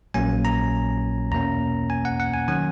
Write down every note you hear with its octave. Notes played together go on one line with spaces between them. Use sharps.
A#1 A#2 F#3 A#3 C#4 G#5
A#5
E2 B2 A#3 C#4 A#5
G#5
F#5
F#5
G#5
D#3 F#3 C#4 G#5